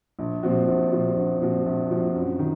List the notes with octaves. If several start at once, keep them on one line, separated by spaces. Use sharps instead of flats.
A#1
A#2 F3 C4 F#4
A#1
A#2 F3 C4 F#4
A#1
A#2 F3 C4 F#4
A#1
A#2 F3 C4 F#4
F#2
D#3